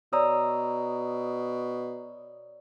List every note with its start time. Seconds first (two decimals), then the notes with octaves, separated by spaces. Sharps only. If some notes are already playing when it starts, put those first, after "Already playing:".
0.13 B2 C#5 D5 A#5 D#6 E6